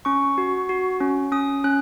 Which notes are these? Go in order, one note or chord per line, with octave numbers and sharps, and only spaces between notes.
C#4 C#6
F#4
F#4
C#4
C#4 D#6
C#4 F#6